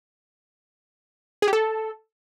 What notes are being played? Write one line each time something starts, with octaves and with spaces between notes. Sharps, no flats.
G#4
G4
A4